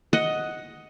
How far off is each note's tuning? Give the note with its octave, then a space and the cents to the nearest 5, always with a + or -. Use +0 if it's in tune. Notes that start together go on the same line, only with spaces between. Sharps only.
D#5 +10 F#5 +0